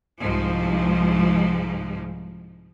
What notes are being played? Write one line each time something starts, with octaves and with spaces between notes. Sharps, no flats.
C2 G#2 F3